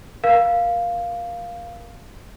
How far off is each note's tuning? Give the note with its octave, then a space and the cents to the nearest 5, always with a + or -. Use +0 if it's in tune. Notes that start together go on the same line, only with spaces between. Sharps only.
A#4 +30 F5 +0